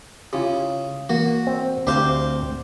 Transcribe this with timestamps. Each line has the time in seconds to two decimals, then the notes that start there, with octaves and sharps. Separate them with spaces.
0.33 C#3 E4 F4 G4
1.09 E3 A#3 F#4 A#4
1.47 C4
1.87 D2 C4 G4 C5 F5